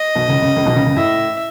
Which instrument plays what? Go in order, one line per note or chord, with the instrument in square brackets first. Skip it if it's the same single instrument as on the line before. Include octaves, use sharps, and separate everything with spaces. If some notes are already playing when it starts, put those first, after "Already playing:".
Already playing: [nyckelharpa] D#5
[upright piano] B1 B2
C#2 C#3
C#2 C#3
C#2 C#3
B1 B2
C#2 C#3
C#2 C#3
[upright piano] A2 [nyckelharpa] E5